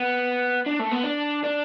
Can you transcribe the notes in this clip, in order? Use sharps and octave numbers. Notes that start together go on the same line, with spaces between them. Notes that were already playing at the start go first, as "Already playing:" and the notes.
Already playing: B3
D4
A3
B3
D4
D4